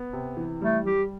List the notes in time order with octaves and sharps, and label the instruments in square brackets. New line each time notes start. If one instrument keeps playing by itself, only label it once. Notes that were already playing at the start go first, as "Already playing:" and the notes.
Already playing: [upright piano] B3
C3
E3
[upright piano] G3 [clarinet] A3
[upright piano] G3 [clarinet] G4